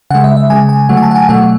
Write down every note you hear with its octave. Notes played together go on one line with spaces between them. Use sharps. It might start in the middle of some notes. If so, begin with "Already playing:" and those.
C#3 G#3 F#5
E5
E5
C#3 G#3 G#5
G#5
D3 F#3 A3 F#5
G#5
A5
F#5
G#5
B2 F#3 A3 F#5